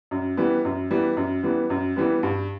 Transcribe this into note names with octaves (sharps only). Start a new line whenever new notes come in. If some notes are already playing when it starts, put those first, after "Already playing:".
F#2
E3 G3 B3
F#2
E3 G3 B3
F#2
E3 G3 B3
F#2
E3 G3 B3
G2